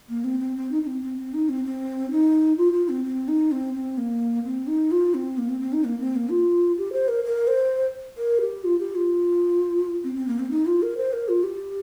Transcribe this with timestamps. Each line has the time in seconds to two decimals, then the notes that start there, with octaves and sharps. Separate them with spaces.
0.09 A#3
0.24 C4
0.40 C4
0.56 C4
0.71 D#4
0.83 D#4
0.87 C4
1.02 C4
1.18 C4
1.34 D#4
1.49 C4
1.65 C4
2.11 D#4
2.58 F4
2.73 F4
2.89 C4
3.04 C4
3.28 D#4
3.52 C4
3.75 C4
3.98 A#3
4.45 C4
4.67 D#4
4.91 F4
5.14 C4
5.38 A#3
5.49 C4
5.61 C4
5.73 D#4
5.84 A#3
6.00 C4
6.16 A#3
6.30 F4
6.78 G4
6.93 C5
7.08 A#4
7.24 A#4
7.48 C5
8.18 A#4
8.41 G4
8.64 F4
8.79 G4
8.95 F4
10.04 C4
10.15 C4
10.28 A#3
10.39 C4
10.51 D#4
10.66 F4
10.82 A#4
10.97 C5
11.13 A#4
11.29 F4
11.44 G4